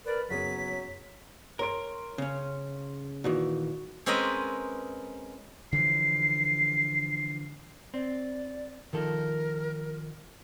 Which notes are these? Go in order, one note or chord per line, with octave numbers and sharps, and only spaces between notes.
A#4 B4 D5
F#1 F#3 B3 G#4 C#5 B6
A#4 C#5 C6 D7
C#3 C#4
A#2 D#3 E3 F#4
G#3 C4 C#4 A#4 B4 D#5
D3 E3 F3 C7
C4 D5
D#3 F3 A4 A#4